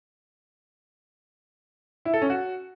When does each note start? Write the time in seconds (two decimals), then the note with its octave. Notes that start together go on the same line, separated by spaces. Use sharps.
2.05 E4
2.14 A4
2.22 C#4
2.30 F#4